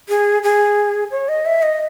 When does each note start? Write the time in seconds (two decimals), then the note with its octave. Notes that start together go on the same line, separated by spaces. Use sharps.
0.09 G#4
0.43 G#4
1.11 C#5
1.29 D#5
1.46 E5
1.62 D#5